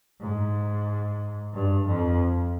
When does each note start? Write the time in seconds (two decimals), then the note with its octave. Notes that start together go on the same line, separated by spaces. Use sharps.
0.21 G#2
1.53 G2
1.87 F2